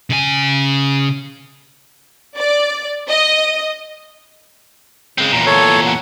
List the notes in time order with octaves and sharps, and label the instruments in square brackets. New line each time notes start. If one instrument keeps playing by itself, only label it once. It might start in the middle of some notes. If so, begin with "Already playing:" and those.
[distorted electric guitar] C#3 G#5
[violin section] D5
D#5
[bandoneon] C#3 [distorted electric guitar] G#3 C4
[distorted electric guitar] E2 A#2 [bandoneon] A#5
[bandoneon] A4 C#5
F#5